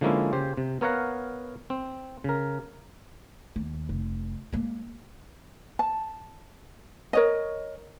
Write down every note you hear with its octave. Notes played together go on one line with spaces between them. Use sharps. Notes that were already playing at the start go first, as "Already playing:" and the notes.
D3 F3 G#3 A#3 C#4 E4
C#3 G4 C5
C3
B3 A#4 C#5 F5 F#5 A#5
C4
C#3 A#4
D#2
F1
G#3 A#3
A5
A#4 C#5 D#5